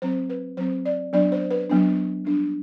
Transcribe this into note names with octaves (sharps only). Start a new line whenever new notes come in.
F#3 C4 C5
B4
F#3 C4 C5
D5
F#3 B3 D4 D5
C5
B4
F#3 B3 D4
G3 D4